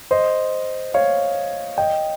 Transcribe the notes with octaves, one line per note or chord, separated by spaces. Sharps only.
C5 D#5
C#5 F5
D#5 G5